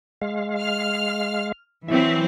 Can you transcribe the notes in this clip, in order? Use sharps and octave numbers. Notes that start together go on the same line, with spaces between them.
G#3 F5
F6
E3 F#3 C4 E5